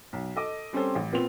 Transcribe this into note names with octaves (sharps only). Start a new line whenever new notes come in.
B1
A4 D#5 D6
G3 C4 C#4 G4 A4 C5
A1
A#2 B3 C4 F7